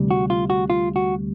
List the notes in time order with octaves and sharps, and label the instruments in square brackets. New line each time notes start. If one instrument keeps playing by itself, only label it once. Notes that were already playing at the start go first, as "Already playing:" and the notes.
Already playing: [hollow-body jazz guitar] D2 C3 E3 G3
F#4
F4
F#4
F4
F#4